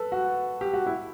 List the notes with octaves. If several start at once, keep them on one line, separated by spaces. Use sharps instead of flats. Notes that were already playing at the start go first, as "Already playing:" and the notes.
Already playing: A4 B4
F#4
G4
F#4
E4